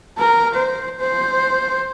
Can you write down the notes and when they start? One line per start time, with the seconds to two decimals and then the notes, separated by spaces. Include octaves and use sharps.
0.18 A#4
0.54 C5
1.00 C5